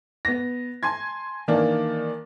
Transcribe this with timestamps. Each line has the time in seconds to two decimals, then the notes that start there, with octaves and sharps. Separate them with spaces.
0.25 B3 A#6
0.83 G#5 A5 C6 G#6
1.48 D#3 E3 A#3 D4